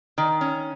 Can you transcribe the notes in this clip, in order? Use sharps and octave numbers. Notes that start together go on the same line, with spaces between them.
D#3
C#4